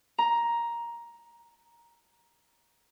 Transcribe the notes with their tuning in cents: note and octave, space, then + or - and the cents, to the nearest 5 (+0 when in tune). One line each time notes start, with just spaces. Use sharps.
A#5 +10